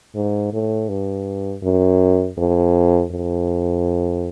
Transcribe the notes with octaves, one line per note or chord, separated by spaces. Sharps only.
G#2
A2
G2
F#2
F2
F2